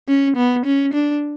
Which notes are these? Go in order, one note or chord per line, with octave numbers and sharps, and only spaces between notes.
C#4
B3
C#4
D4